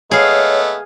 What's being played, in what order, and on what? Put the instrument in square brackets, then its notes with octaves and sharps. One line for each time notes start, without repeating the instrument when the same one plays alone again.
[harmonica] A3 B3 [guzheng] G#4 F5 [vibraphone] C#5 [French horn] D#5